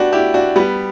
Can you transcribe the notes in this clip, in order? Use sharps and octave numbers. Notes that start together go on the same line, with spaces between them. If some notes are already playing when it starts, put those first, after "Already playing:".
Already playing: D4 F#4 G4 B4
E4 G4
D4 F#4
G3 B3